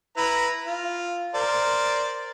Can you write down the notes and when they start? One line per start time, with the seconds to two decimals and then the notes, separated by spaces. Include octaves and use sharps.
0.17 E4 B4 A#5
0.67 F4
1.35 A#4 C5 D5